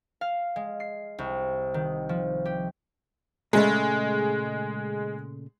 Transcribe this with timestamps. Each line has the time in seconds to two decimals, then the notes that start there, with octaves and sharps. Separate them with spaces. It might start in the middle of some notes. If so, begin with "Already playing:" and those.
0.21 F5
0.56 G#3
0.80 C7
1.19 C2
1.74 D#3
2.09 F3
2.45 G4
3.53 A#2 C#3 G#3 A3